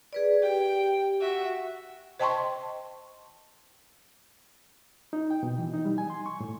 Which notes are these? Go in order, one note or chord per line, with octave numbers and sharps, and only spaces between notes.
G#4 B4 D5
G4 G5
F#4 E5
C5 D#5 G5 A5 C6 C#6
D#4
G5
B2
E3
D#4
G3
G#5
C6
C#6
A2